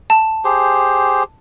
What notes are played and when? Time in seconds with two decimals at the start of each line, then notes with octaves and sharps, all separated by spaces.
0.10 A5
0.45 G4 G#4 C5